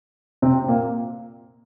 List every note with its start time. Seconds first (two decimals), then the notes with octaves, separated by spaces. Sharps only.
0.42 C3 C4
0.68 A#2 A#3